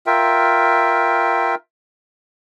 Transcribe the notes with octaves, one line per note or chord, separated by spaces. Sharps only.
F4 A#4 E5 G5